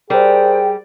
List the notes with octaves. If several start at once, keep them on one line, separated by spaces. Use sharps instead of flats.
G3 G#4 A#4 C5 G5